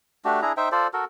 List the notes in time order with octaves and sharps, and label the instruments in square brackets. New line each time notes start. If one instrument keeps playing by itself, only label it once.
[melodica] A3 D4 F#4 G4
D4 E4 G#4 A#5
D#4 C5 E5 G5
F4 A4 C5 D5
F#4 A4 A#4